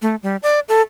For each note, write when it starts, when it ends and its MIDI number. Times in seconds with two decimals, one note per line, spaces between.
0.02 0.15 57
0.23 0.36 55
0.43 0.60 74
0.69 0.81 69